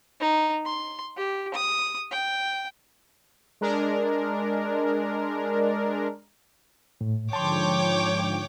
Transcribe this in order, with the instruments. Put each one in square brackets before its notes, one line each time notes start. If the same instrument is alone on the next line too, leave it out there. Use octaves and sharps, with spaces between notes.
[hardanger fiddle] D#4
C6
G4
D#6
G5
[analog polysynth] G#3 D4 A#4
[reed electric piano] A2
[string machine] G#2 D3 F3 [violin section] C#5 G5 D6 [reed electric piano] A5 C6